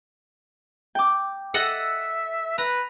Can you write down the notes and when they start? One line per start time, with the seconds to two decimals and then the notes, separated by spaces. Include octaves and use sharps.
0.95 G5 D6
1.54 A4 D#5 E5 F#5
2.58 B4 A#5